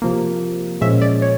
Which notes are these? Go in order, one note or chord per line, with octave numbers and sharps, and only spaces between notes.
C3 F3 A#3
A#2 F3 G#3 C#4 E5
D5
C#5